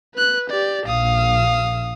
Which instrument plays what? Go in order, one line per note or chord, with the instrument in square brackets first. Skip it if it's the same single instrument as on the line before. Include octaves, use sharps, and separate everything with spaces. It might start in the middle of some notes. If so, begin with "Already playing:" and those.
[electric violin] B4 F#6
G4 D5
[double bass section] A#1 [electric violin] F5 D#6